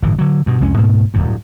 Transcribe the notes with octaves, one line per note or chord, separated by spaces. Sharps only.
G1 A2 E3
D3 F#3
G2 B2
C2 F2 G#3 C#4
D2 G#2 B2 A3
D1 E2 G2